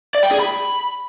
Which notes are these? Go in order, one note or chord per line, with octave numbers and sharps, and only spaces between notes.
D5
G5
G#4
B5